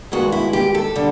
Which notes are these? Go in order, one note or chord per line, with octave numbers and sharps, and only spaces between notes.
G2 D#3 G#3 F#4
E4
G4
A4
D3 G3